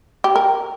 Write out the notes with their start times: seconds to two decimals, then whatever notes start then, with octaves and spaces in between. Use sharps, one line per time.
0.24 G4
0.36 A#4